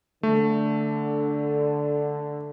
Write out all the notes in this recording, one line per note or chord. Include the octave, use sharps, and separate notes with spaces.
D3 A3